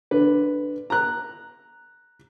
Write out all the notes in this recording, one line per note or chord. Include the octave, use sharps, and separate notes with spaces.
D3 B4
A#5 F#6